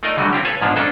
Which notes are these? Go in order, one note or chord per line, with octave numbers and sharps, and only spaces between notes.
A3 D#4 F4 A#4 D5 D#5
D3 F#3 G3 A3 F#4
C4 E4 F4 G4
A4 B4 C#5 F5 G#5
G#2 F3 A#3 B3 D4 F4
C#4 D4 F4 A4 A#4 C5